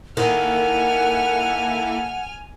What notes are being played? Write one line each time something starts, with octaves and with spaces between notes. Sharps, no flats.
D#3 A#3 E4 A4 F#5 G#5 F6